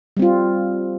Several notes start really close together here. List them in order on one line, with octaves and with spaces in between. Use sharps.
G3 C4 F4